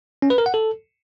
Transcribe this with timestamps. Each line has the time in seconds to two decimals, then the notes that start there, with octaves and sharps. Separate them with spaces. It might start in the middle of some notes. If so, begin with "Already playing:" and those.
0.22 C#4
0.30 B4
0.38 A#4
0.46 F#5
0.54 A4